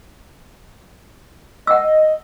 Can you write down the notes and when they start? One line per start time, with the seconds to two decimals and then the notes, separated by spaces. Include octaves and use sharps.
1.67 D#5 F#5 E6